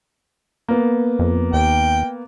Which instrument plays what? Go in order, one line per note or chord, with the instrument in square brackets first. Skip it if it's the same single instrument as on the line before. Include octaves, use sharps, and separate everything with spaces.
[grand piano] A#3 B3
[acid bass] F2
[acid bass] D#2 [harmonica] G5